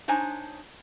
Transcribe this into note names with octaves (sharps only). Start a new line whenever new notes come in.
D4 D#4 C5 C#5 G#5